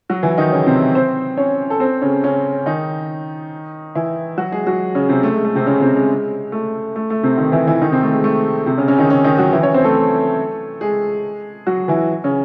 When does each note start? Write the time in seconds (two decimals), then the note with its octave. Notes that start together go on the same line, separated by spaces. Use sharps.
0.09 F#3 F#4
0.23 E3 E4
0.38 D#3 D#4
0.51 C#3 C#4
0.66 C3 C4
0.95 C4 C5
1.37 C#4 C#5
1.70 A4
1.80 C4 C5
2.01 C#3 C#4
2.23 C#3 C#4
2.66 D#3 D#4
3.95 E3 E4
4.38 F#3 F#4
4.52 G#3 G#4
4.66 F#3 F#4
4.95 C#3 C#4
5.09 C3 C4
5.23 A3
5.34 G#3
5.45 A3
5.55 C3 C4
5.66 C#3 C#4
5.81 C3 C4
5.95 G#3
6.52 A3
6.96 A3
7.10 A3
7.23 C3 C4
7.38 D#3 D#4
7.52 E3 E4
7.67 E3 E4
7.82 D#3 D#4
7.92 C3 C4
8.03 A3
8.13 G#3
8.24 A3
8.66 C3 C4
8.77 C#3 C#4
8.88 C#3 C#4
8.98 D#3 D#4
9.09 C#3 C#4
9.25 D#3 D#4
9.38 F#3 F#4
9.53 E3 E4
9.63 C#4 C#5
9.74 C4 C5
9.84 A3 A4
10.81 G#3 G#4
11.67 F#3 F#4
11.88 E3 E4
12.24 C#3 C#4